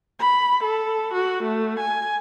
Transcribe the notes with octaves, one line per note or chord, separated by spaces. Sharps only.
B5
A4
F#4
A3
G#5